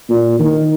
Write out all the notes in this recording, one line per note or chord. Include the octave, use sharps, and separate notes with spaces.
A#2
D#3